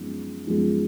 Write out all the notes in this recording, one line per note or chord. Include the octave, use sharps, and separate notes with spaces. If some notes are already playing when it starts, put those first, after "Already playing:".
Already playing: F#2 F3 G#3 B3 D#4
F#2 F3 G#3 B3 D#4